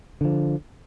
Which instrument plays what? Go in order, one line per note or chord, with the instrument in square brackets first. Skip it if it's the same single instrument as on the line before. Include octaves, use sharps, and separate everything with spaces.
[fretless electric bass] D3 F3